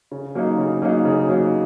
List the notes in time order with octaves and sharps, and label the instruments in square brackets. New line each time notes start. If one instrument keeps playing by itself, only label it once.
[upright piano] C#3
F#3 A#3 D#4
C#3
F#3 A#3 D#4
C#3
F#3 A#3 D#4